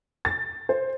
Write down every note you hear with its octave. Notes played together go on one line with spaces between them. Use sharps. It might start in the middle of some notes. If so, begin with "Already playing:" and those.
A6
C5